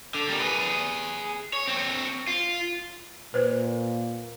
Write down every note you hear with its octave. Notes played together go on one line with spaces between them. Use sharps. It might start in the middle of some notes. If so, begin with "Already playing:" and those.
D3
G3 A#3
G#4 B4
C#5
C4 C#5
F4
A#2 B4 C5